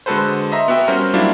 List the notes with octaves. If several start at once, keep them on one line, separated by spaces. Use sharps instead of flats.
D3 G#3 F#4 A4 B4 C5
D#5 E5 A#5 C6
B3 F#4 E5 G5
G3 C#4 F#4 A#4 C5
F#3 G3 A#3 D4 E4 F4